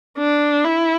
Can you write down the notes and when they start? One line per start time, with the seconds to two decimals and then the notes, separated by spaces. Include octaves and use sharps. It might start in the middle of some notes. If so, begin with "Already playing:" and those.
0.18 D4
0.65 E4